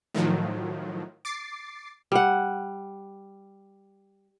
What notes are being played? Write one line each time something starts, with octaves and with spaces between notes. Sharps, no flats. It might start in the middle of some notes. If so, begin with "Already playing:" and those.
A2 D#3 F3 F#3
D6 A6 C7
G3 F#5